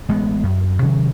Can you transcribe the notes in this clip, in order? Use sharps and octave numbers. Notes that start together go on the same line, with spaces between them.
A1 G#3 A#3 B3
F#2
C3 D#3 F#3 C#4